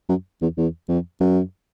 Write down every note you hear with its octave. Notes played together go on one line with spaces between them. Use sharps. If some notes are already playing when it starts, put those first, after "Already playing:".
F#2
E2
E2
F2
F#2